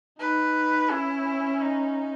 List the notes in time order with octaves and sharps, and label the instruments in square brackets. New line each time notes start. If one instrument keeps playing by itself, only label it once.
[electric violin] D#4 [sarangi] B4
[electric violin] C#4 [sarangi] E4
[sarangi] D#4